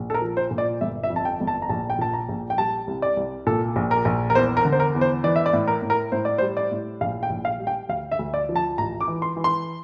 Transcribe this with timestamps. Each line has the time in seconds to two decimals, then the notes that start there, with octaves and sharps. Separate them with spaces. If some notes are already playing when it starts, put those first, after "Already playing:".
Already playing: A#1
0.10 A4
0.14 A#4
0.22 F3
0.37 C5
0.51 A#2
0.58 D5
0.81 G1 E5
1.03 E5
1.10 F2
1.16 A5
1.25 G5
1.40 G1
1.47 A5
1.62 A#5
1.69 A#1 A5
1.90 G5
1.99 A#2 A5
2.13 A#5
2.29 A#1
2.50 G5
2.58 G3 A5
2.87 C2
3.02 D5
3.17 C2
3.47 A#2 A4
3.76 A#1
3.91 A#4
4.05 A#1
4.30 A#4
4.35 E2 C5
4.57 A#4
4.65 D3
4.72 C5
4.80 A#4
4.95 E2
5.01 C5
5.24 E3 D5
5.36 E5
5.46 D5
5.53 A2
5.68 A#4
5.82 A2
5.90 A#4
6.12 A2 C5
6.25 D5
6.38 C5
6.41 G3
6.57 D5
6.72 A2
7.01 A#1 F5
7.23 G5
7.30 A#1
7.45 F5
7.59 G3
7.67 G5
7.89 D2 F5
8.12 E5
8.19 D2
8.34 D5
8.49 F3
8.56 A5
8.78 A1 A#5
9.01 D6
9.07 E3
9.22 C6
9.37 E3
9.44 C6